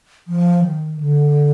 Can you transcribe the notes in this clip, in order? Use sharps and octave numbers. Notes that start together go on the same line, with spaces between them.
F3
D#3
D3